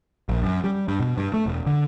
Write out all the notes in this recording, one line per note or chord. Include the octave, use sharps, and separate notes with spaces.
A#1
F#2
G3
G2
B2
G2
A3
E1
D3